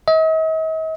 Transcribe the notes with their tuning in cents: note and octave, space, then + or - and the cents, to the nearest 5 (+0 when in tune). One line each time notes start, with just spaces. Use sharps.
D#5 +45